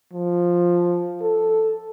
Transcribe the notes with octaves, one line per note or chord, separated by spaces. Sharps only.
F3
A4